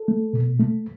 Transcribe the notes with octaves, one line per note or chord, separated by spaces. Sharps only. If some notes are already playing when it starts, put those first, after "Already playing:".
Already playing: A4
A3
B2
A3